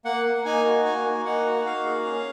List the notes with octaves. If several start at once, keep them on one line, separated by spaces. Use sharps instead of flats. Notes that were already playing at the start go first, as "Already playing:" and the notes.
A#3 F#5
A#3
D#4 G#5
F#4
A#3 G#5
A#3
D#4 F#5
F#4
A#3 F5
G#4
C#4